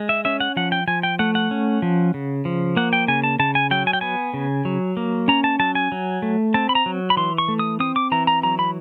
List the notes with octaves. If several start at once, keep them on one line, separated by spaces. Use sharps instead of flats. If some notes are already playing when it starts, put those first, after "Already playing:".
Already playing: G#3
E5
C#4 E5
F#5
F3 F#5
G5
F3 G#5
G5
A3 F#5
F#5
C#4
F3
C#3
F3
A#3 F#5
G5
C#3 G#5
A5
C#3 A5
G#5
F#3 G5
G#5
G5
B3 G#5
C#3
F#3
A#3
C#4 A#5
A5
F#3 A5
G#5
F#3
A3
C4 A5
B5
A#5
F#3
B5
E3 C6
C#6
A3
D#6
C4 D#6
D6
E3 A#5
A#5
F#3 A#5
B5